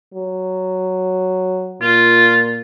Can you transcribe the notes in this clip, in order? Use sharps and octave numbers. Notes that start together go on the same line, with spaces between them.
F#3
A#2 F4